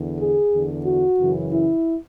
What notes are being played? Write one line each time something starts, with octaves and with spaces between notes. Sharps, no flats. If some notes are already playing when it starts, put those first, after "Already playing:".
Already playing: E2 D3
G#4
E2 D3
F#4
F#2 C#3 E3
E4